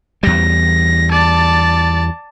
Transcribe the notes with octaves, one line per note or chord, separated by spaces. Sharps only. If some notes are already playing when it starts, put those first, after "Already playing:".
E2 G3 A#6
D5 A5